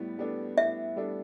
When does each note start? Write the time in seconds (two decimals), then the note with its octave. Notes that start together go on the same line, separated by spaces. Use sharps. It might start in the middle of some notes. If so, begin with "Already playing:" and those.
Already playing: A2 G3 B3
0.18 G3 B3 D4 A4
0.57 A2 E5
0.96 G3 B3 D4 A4